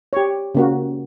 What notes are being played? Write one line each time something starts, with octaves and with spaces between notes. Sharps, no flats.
G4 C#5
C#3 A#3 F#4